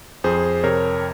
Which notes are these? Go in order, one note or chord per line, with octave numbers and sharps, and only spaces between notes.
F2 G#4 C5
C3 A#4 C#5